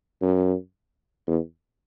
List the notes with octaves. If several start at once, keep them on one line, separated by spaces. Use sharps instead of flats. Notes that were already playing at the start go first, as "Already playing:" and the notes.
F#2
E2